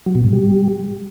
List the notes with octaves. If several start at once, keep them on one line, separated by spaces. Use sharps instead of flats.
F#3
B2
G#2
G3